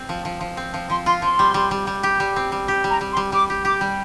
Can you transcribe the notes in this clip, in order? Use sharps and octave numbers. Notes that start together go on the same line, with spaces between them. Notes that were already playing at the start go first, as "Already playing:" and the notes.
Already playing: C4
F3
F3
F3
C4
F3
F3 C6
F4 C6
F3 C6
G3
G3
G3
G3
G4
G3
C4
G3
G4
G3
A#5
G3
C6
G3
G3 D6
G4
G4 D6
G3